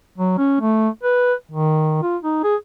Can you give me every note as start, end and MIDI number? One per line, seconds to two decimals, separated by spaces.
0.18 0.36 54
0.38 0.57 61
0.61 0.89 57
1.03 1.34 71
1.51 1.97 51
2.02 2.17 65
2.23 2.40 63
2.44 2.56 68